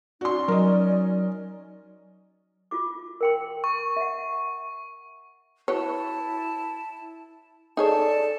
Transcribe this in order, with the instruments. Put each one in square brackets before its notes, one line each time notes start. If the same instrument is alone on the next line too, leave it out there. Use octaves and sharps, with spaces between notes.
[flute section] C#4 D#4 D5 [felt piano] F#4 C6
[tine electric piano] F#3 [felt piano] A#4 D#5
[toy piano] F4 F#4 D6
A#4 G5 C6
[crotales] C#6
[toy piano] E5 F#5
[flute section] E4 A5 [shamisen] F#4 B4 C#5
[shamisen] D#4 G#4 C#5 [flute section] A4 D5 A5